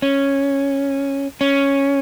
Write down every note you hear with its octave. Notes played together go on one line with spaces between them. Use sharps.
C#4
C#4